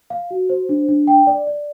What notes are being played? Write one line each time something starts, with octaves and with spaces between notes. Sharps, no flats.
F5
F#4
C5
D4
D4
G5
D5
D5